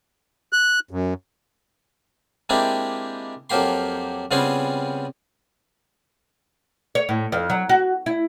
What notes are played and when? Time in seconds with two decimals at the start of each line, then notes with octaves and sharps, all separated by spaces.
0.53 F#6
0.91 F#2
2.49 G#3 A#3 C4 D4 E4 G4
3.50 F2 F3 F#3 A#3 G4 C6
4.31 C#3 G3 B3 C4 F4 G#4
6.95 C#5
7.09 A2
7.32 F2
7.50 F#3
7.69 F#4
8.06 E4